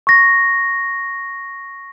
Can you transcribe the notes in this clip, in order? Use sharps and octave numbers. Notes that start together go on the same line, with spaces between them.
C#6 A#6